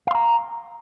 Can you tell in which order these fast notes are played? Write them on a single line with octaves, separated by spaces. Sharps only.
F5 C6 A#5